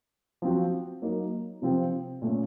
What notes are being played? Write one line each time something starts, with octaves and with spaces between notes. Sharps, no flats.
F3 C4 F#4
F#3 A#3 D#4 A#4
C3 F3 C4
A#2 A3 C#4